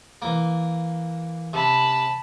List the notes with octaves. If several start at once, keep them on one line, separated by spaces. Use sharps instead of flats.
E3 A#3
C3 A5 B5